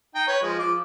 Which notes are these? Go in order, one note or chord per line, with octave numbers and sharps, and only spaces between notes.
D#4 G5
B4 C#5
F3 G#3
F3 D6